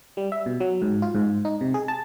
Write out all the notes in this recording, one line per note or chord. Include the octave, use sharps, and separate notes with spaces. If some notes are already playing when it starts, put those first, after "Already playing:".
G3
E5
B2
F#3
G#2
F4
G#2
D#4
C3
G#4
A5